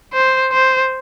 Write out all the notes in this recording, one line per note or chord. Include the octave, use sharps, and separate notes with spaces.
C5
C5